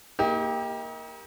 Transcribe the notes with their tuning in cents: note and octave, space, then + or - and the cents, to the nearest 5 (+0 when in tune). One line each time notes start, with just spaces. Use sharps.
A#3 +0 D#4 +40 G4 +15